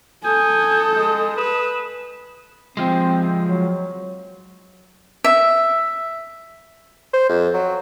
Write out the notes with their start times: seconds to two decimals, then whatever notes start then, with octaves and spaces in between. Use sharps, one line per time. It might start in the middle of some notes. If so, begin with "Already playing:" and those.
0.24 A4 G#5 D#6 G6
0.95 G#3
1.37 B4 E7
2.77 F3 G#3 C4
3.47 F#3
5.24 E5
7.13 C5
7.29 F2
7.54 F#3